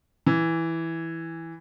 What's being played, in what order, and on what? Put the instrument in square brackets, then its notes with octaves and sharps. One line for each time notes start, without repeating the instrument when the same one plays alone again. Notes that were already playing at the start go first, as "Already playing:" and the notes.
[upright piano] E3